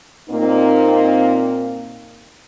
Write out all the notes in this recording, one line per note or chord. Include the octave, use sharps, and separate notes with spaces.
A#2 A#3 C4 D#4